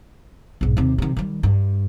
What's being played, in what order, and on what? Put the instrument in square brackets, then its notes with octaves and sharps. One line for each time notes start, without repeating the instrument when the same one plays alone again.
[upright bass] B1 G#2
D#2 C3
C3 D#3
D#3 G3
G2